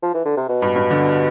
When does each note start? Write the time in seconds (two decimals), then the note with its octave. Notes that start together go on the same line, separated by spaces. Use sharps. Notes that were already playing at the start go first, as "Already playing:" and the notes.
0.03 F3
0.14 E3
0.25 D3
0.37 C3
0.49 B2
0.62 G2
0.76 G2
0.91 D3